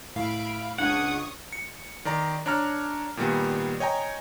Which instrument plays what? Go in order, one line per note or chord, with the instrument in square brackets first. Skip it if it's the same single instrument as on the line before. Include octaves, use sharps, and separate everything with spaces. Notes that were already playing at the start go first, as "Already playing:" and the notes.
[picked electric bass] A2 [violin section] E5 B5 D7 [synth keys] F5
[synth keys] C#2 D4 G#6 [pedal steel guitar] F#5 [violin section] C#6 D#6
[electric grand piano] C#7
D#3 D5 A#5
D4 C#5 A#5 F6
A#2 D#3 G3 B3
C#5 D#5 G5 G#5 A#5